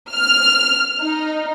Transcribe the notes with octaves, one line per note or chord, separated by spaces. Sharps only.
F6
D#4